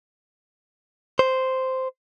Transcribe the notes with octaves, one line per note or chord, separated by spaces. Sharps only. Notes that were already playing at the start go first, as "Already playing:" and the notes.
C5